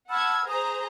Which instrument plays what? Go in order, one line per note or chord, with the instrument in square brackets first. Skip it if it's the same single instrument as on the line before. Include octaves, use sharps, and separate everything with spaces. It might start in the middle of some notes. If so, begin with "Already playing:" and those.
[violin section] F#5 A5 G#6 [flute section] B5 E6 F6
[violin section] G#4 C5 A#5 [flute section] D#6